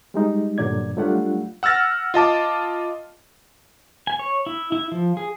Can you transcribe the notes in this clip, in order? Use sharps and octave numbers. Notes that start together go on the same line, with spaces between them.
G3 G#3 D#4
G2 A#2 D3 F#3 D5 G#6
F#3 G3 A3 D4 F4 F#5
F#5 E6 F6 A6 A#6
F4 D#5 A5 D6
G#5
C#5
E4
E4
F3
G#4